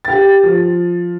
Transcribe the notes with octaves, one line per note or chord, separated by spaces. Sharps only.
G4 A6
F3